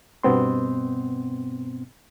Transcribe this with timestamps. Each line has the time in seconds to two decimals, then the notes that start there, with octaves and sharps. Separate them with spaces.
0.23 G2 B2 B3 C4 C6